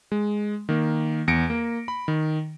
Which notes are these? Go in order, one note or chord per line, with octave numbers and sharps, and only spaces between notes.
G#3
D#3 A#3
E2 A#6 C#7 D7
A#3
B5
D#3